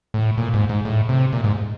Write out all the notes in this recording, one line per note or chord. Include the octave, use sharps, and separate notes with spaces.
A2
A#2
G#2
G#2
A2
C3
A#2
G#2